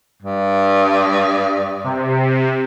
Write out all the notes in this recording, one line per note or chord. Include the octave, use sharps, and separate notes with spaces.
G2
C3